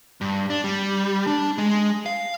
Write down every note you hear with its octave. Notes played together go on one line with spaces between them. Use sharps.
G2
D4
G3
D4
G#3
F5